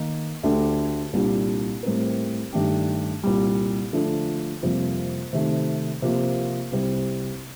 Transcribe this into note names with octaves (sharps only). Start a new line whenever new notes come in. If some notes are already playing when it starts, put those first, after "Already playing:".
Already playing: D#3 A#3 D#4
D2 D3 A3 D4 G4
C2 A#2 G3 D4
A2 G3 C4 G4 A#4
G2 D#3 A3 D4 G4
C2 A#2 G3
D3 F3 A3 D4 A4
F2 C3 G3 A#3 F4
C3 D#3 A3
C3 F3 A#3
C2 C3 G3 C4